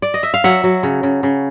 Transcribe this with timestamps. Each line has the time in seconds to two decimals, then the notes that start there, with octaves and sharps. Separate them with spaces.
0.02 D5
0.14 D#5
0.23 E5
0.34 F5
0.44 F#3 E5 F#5
0.64 F#3
0.83 C#3
1.03 C#3
1.23 C#3